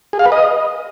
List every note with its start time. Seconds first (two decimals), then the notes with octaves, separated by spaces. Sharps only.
0.13 G#4
0.19 F5
0.26 B4
0.32 D#5